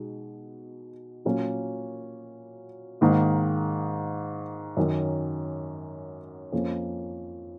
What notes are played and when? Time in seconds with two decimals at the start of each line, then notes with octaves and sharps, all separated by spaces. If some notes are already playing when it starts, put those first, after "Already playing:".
Already playing: B2 G#3 D#4
1.25 A#2 F#3 A#3 C#4
3.01 G#2 D#3 A#3
4.77 F#2 D#3 F#3 C#4
6.52 F2 F3 A#3 C#4